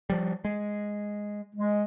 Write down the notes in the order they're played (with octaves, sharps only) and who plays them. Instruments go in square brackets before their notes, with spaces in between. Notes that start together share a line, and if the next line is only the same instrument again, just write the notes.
[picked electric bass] F3 G3
G#3
[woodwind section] G#3